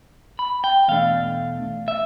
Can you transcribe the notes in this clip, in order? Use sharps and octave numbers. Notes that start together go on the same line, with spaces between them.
B5
G5
E2 B2 A3 D4 F5
E5